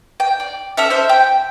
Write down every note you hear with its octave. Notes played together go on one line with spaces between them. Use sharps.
G5
D5
C#4 A4 E5
C5 E5
G5